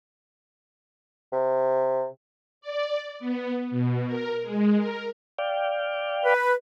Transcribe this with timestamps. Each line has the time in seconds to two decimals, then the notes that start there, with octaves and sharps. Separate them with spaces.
1.33 C3
2.61 D5
3.19 B3
3.71 B2
4.06 A#4
4.42 G#3
4.77 A#4
5.39 D5 F5 G5
6.25 B4